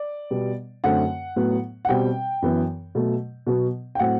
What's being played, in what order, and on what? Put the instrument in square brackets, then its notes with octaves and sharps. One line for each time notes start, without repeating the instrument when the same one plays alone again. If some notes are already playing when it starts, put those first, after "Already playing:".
Already playing: [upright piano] D5
B2 G3 B3
F#2 D3 A3 C4 F#5
A2 F#3 B3
F#5
B2 G3 C4 G5
F#2 E3 B3
B2 F#3 A3
B2 F#3 B3
G5
A2 F#3 C4 F#5